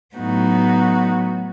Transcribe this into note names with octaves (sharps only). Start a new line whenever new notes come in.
A2 F#3 B3 D#4 F#4